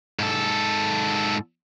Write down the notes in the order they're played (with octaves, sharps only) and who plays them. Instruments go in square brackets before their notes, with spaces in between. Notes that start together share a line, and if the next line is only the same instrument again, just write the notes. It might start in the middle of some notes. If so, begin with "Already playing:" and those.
[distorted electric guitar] G#2 A4